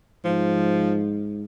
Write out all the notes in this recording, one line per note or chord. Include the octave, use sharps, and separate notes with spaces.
G#2 F3